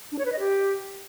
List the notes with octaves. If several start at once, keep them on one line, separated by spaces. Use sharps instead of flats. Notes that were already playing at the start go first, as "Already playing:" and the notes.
D4
C#5
B4
D#5
G4